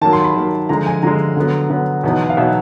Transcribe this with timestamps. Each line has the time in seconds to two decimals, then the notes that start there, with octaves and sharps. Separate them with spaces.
0.01 D#3 F#3 A#3 A5
0.13 C6
0.24 B5
0.35 D#3 F#3 A#3
0.69 D3 F3 G#3 A#5
0.86 G#5
1.03 D3 F3 G#3 A#5
1.36 D3 F#3 B3
1.70 D3 F#3 B3
2.03 E2 B2 F#3 B3 D#4
2.30 F5
2.37 B2 F#3 B3 D#4 E5